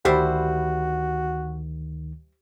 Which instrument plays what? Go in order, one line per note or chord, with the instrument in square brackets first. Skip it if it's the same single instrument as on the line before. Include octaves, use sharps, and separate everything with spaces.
[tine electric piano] D2 D#3 [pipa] G3 E4 C5 [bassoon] F#4 [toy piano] G4